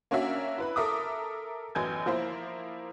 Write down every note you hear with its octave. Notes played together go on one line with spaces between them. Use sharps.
A#3 C#4 D4 F#4 E5
E4 B4 B5
A4 A#4 E5 D6 D#6
A1 F#2 B3 G#5 G6 G#6
F3 A#3 E4 C5